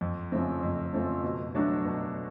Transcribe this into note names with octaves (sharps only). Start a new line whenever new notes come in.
F2
C#3 F3 A3 C4
F2
C#3 F3 A3 C4
B2
F#3 A3 D4 F#4
B2